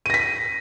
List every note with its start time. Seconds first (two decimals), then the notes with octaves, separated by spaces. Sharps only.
0.06 D#7
0.10 A#6
0.14 B6